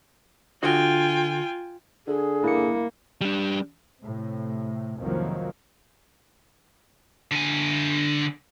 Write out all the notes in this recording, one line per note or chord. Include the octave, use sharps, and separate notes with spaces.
D3 F4 F#4 D#5 G5 G#5
D3 G#4
A#3 E4 C#7
G3 D4
A2 C3
C2 F2 D#3 F3 F#3 A#3
D3 G#5